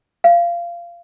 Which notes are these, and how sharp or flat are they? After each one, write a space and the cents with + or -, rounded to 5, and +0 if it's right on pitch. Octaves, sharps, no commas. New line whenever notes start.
F5 -20